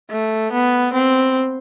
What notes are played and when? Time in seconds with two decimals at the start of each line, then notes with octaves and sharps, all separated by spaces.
0.10 A3
0.52 B3
0.93 C4